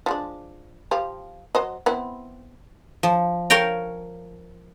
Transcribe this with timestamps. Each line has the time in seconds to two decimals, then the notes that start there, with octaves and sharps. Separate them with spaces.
0.06 F3 G#3 D4
0.91 F3 G4 F5
1.55 F#3 C5 D#5
1.86 B3 C4 E4
3.03 F3
3.50 A#4 C#5 F5 G5 A#5